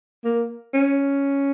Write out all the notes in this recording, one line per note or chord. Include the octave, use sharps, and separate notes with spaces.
A#3
C#4